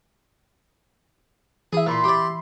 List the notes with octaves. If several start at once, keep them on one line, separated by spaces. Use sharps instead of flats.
E3 G#4 E5
A#2 E5 B5 C6
G4 D5